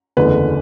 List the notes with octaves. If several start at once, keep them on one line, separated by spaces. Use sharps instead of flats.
F#1 E2 D3 A3 B4